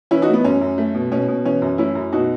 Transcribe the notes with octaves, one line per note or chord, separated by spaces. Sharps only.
E3 C#4 E4
D#4 F#4
A3
B3
F#2 C#4
F#2
A3
B2
B2 C#4
B2
E3 C#4
F#2
A3 C#4 E4
F#2
B2 D#4 F#4